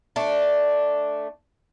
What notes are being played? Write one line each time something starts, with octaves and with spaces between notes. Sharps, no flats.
A3 D4